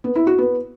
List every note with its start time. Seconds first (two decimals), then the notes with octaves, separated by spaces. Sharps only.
0.04 B3
0.15 E4
0.27 F#4
0.38 B3